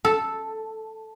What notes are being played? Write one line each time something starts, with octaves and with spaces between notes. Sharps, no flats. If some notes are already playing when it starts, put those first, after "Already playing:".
A4